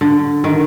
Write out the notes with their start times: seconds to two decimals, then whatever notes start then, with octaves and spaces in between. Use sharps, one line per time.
0.01 D3
0.44 D#3